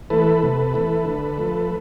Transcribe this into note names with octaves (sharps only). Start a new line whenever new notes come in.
E3 A3 A4 B4
C3
E3 A3
D3
F3 A3